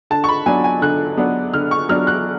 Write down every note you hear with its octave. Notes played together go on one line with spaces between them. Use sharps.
D3 A5
C#6
B5
F#3 B3 D4 G#5
G#5
D3 F#6
F#3 B3 D4
D3 F6
C#6
F#3 B3 D4 F6
F#6